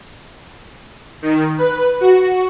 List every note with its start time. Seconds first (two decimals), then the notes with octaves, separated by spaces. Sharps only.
1.22 D#3
1.59 B4
2.01 F#4